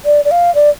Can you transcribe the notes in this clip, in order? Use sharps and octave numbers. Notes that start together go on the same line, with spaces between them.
D5
D5
F5
D5